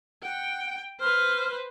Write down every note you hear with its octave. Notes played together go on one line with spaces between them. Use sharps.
F#5 G5
B4 C5 F6